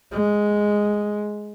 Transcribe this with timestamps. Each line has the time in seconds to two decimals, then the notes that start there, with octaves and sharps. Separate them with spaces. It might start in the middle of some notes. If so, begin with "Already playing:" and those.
0.12 G#3